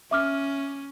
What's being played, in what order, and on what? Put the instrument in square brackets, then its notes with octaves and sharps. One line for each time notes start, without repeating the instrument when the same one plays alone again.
[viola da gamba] C#4 [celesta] E5 D6 F6